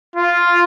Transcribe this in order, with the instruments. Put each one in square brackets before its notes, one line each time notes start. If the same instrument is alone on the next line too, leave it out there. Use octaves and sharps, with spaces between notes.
[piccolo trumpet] F4